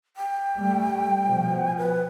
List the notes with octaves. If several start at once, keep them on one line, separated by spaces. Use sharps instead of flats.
G5
G3 A3
B2 F3
B4